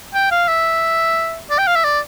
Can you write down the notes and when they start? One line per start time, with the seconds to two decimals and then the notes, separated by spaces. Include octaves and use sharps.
0.14 G5
0.31 F5
0.48 E5
1.50 D5
1.59 G5
1.67 F5
1.76 E5
1.84 D5